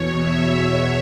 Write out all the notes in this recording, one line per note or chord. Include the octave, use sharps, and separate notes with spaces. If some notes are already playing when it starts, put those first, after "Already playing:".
Already playing: E2 B2 C#5
E5
E5